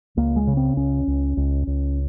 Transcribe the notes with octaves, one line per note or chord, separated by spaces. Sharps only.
C#2 A#3
G#3
C#3
C4
C#2 C#4
C#2
C#2
C#2